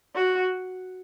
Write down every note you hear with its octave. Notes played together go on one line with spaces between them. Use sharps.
F#4